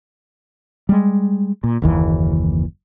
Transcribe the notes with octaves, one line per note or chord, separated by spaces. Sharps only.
G3 G#3
A#2
F#1 D#2 E3